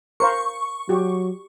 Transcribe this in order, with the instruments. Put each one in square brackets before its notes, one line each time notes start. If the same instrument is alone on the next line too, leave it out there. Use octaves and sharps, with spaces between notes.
[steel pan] A#4 C5 F5 [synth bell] C#6
[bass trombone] F#3 [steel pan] F#4 G4